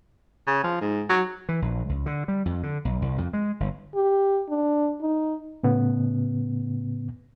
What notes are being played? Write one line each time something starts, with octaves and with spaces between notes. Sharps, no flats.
C#3
F3
G#2
F#3
E3
A#1
C#2
D3
G3
F2
D3
B1
C2
F2
G#3
G1
G4
D4
D#4
A2 C#3 B3